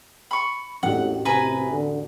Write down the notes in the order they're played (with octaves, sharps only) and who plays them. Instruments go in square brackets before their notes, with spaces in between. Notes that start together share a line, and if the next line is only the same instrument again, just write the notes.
[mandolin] B5 C#6
[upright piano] E1 A1 G4 [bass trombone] A2 [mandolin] F#5
[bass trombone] C3 [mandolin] B4 G#5 A#5
[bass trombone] D3